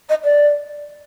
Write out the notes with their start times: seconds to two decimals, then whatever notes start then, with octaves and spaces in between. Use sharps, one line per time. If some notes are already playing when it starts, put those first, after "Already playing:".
0.09 D#5
0.24 D5